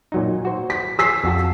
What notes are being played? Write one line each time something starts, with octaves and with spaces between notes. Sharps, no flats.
A#2 F#3 D#4
F#4 C5
B6
G#4 E6 B6 C7
F2 F#4 A5